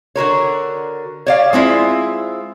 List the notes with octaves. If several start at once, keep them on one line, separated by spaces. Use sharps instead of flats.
D3 F#4 A#4 C#5
C#5 D5 F5
G#3 C4 E4 F4